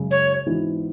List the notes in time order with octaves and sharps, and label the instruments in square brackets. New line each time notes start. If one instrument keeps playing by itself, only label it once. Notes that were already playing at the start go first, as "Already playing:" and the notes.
Already playing: [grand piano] F#2 C#3 G#3
[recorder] C#5
[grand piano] G#2 E3 B3 D4 F#4